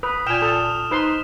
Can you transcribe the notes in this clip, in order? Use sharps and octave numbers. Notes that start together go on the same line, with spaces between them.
B4 D#6
A#2 G5 G#5 F6 E7 F7
A4 D#6
D#4 B4 C5 C6